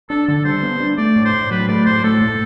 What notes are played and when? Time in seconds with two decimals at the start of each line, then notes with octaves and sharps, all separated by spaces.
0.10 D4 A4
0.27 D3 A4
0.45 G3 C5
0.63 B3
0.80 D4
0.98 A3 D5
1.16 A2
1.25 C5
1.33 A2
1.51 F#3 B4
1.69 A3 D5
1.86 A2 C5
2.04 A3 A4
2.22 A2